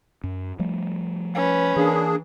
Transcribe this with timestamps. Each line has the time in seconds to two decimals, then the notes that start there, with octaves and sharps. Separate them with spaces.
0.24 F#2
0.59 F3 G3 A3
1.35 C#4 B4
1.76 E3 A#3 D4 G#4